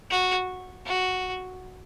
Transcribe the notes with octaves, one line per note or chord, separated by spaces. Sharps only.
F#4
F#4